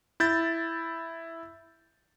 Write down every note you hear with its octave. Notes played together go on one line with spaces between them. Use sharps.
E4 G6 A6